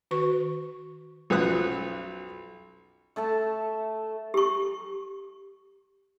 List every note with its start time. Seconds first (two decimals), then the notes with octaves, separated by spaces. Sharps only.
0.11 D#3 F#4 B4 C#6
1.30 B1 F#2 F3 B4 D#6 F#6
3.16 A3 A4 E5 A5
4.34 G4 C#6